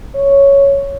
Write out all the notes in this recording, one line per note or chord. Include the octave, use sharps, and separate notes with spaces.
C#5